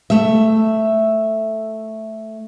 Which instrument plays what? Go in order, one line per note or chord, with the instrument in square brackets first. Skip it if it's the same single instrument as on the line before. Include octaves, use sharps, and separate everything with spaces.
[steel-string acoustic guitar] A3 E5